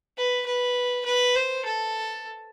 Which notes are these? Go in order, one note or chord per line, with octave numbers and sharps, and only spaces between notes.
B4
B4
B4
C5
A4